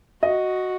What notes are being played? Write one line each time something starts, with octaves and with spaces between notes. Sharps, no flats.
F#4 D#5